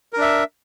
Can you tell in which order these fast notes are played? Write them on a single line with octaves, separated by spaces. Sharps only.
A#4 D4 E5